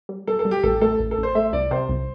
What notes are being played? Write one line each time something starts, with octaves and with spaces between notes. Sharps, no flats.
G3
G3 A4
A4
G3
G4
A1 A4
A3 A4
A1
A4
A1
C5
A3 E5
C2 D5
C3 C5
C2